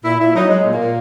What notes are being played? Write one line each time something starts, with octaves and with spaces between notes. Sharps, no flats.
A#2 E4
A#2 E4
F#3 D#4
F#3 G#3
A#2
A#3
A#2